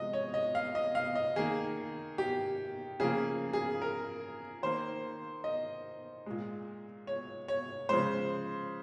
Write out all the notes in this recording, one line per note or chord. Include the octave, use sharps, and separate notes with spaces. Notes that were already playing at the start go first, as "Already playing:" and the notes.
Already playing: C3 F3 G#3 D#5
C#5
D#5
F5
D#5
F5
D#5
D#3 A#3 G#4
G4
C#3 F3 A#3 G#4
G#4
A#4
D#3 A#3 C5
D#5
A#2 G#3
C#5
C#5
C#3 F3 G#3 C5